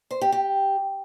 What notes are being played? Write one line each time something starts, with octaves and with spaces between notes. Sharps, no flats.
C5
G4
G4